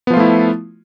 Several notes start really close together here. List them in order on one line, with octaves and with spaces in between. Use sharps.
B3 F3 F4 A3 E4